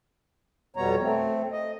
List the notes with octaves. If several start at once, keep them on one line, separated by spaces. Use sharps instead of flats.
F2 B2 G3 B3 C#5 A#5
A3 C4
D#5